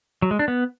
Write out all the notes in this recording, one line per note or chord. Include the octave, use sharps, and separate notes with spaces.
F#3
G#3
D4
B3